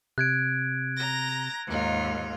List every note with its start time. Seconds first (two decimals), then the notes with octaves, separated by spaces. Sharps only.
0.18 C3 F#6 G#6 D7
0.97 A#5 G6 A#6
1.67 D#2 G#2 F4